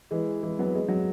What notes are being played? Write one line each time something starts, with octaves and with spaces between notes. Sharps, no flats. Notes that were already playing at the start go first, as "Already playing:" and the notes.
E3 G#3
E3 G#3
F#3 B3
G#3
F#3